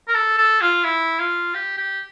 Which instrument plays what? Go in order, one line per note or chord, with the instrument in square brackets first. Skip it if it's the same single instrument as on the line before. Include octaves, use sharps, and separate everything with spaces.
[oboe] A#4
A4
A4
F4
E4
F4
G4
G4